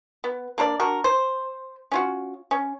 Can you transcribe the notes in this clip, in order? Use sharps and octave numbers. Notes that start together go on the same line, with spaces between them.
B3
A#3 D4 A#4 D5
D4 F#4 A#4
C5
C#4 F4 F#4
C#4